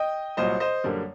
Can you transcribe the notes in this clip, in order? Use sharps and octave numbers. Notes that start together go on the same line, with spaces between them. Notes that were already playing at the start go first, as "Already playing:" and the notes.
Already playing: D#5 G5
C2 A#2 F#3 C5 D#5
C5 D#5
F#2 D3 G3 A#3